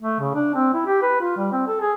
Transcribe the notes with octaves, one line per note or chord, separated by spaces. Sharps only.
A3
C#3
D4
C4
E4
G4
B4
F4
G3
C4
A4
G#4